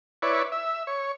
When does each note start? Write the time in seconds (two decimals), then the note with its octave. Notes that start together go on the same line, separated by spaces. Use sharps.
0.22 E4 B4 C#5 D5
0.52 E5
0.87 C#5